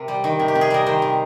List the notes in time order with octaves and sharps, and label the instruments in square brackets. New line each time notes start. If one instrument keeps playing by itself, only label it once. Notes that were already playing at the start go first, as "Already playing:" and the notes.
Already playing: [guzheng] C3 A#4
G3
D#3
C3
G4
C3
G#4
G3 A#4
D#3 C5
C3